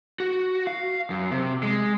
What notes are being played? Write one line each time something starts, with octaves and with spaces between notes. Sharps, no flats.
F#4
F5
F#2
C3
G#3